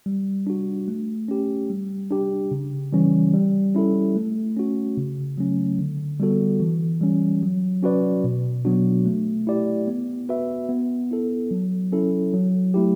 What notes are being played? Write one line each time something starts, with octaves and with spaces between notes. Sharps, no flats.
G3
D4 F#4
A3
C#4 G4
G3
D4 G4
C#3
E3 G3 C#4
G3
C#4 E4 A4
A3
C#4 F#4
C#3
F#3 A3 C#4
D3
G3 B3 F#4 A4
E3
G3 C#4
F#3
C#4 F#4 B4 D5
B2
F#3 B3 D4 F#4
A3
E4 G4 D5
B3
F#4 B4 E5
B3
E4 A4
F#3
C#4 E4 A4
F#3
A3 E4 G4